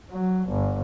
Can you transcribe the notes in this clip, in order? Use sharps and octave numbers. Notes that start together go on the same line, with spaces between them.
F#3
G1